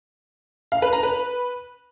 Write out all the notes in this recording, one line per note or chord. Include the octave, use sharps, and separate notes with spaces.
F5
B4
A#5
B4